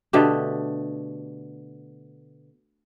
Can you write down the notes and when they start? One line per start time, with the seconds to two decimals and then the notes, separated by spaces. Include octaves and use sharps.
0.13 B2 D3 A3 G4